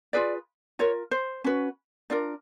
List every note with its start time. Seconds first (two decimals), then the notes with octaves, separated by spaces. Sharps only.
0.13 F4 G#4 B4 D5
0.79 F4 A#4 C#5
1.11 C5
1.44 C#4 F#4 B4
2.10 D4 F4 A#4 D5